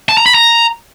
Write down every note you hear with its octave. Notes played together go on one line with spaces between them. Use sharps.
A5
A#5
B5
A#5